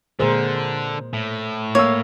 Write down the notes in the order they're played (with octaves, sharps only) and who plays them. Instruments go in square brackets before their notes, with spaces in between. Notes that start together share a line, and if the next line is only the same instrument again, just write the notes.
[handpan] A#2 A#4 C5 [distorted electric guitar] D3 [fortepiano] G#3
[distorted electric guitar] A2
[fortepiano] A#3 E6 [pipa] C#5